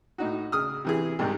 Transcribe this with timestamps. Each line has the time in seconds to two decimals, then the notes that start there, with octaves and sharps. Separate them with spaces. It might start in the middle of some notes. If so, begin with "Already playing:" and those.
0.18 A2 D#4 F#4
0.52 C#3 D#6 F6
0.85 C3 E3 G#4
1.19 C2 G#2 C3